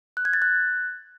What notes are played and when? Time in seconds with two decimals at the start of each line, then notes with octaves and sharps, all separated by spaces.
0.17 F#6
0.25 G#6
0.33 A6
0.42 F#6